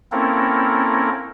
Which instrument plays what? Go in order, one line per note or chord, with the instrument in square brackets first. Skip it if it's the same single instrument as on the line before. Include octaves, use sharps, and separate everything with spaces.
[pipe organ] A#3 C4 C#4 E4 A4 A#4